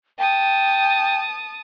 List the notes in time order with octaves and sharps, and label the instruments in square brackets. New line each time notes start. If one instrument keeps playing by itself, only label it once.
[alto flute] G5 [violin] A5 D#6